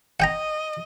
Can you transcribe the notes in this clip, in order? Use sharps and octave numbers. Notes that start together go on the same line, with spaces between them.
D#5 F#5 G5 A#5